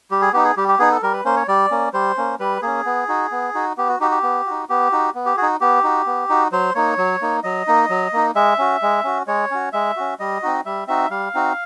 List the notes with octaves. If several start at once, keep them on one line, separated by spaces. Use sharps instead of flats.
G3 G4
G#4
B3 D#4 G4
G#4
G3 G4
G4
B3 D#4 G#4
A4
G3 A#4
B4
A#3 C#4 C5
C#5
G3 D5
A#3 C#4
G3 C5
A#3 C#4
G3 B4
A#3 C#4 G#4
B3
D#4 F#4
B3
D#4 F#4
B3 G4
F#4
D#4 F#4 G4
G4
B3
D#4 F#4
B3 G4
D#4 F#4
B3
G4
F#4 G#4
D#4
B3 G4
D#4 F#4
B3
D#4 F#4
F#3 C5
A#3 D#4 C#5
F#3
A#3 D#4
F#3 D#5
A#3 D#4
F#3
A#3 D#4
G#3 E5
C#4 F#4
G#3
C#4 F#4
G#3 C#5
C#4 F#4
G#3 E5
C#4 F#4
G3 D#5
C4 D#4 F#4
G3 E5
C4 D#4 F#4 E5
G3 F5
C4 D#4 F#4